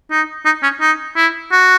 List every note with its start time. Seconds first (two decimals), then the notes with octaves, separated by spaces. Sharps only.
0.11 D#4
0.45 D#4
0.63 C#4
0.81 D#4
1.16 E4
1.52 F#4